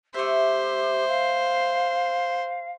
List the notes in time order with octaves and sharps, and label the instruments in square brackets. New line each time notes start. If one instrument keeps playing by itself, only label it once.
[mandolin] A3 E5 [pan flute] G4 [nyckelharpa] C5
[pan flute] F5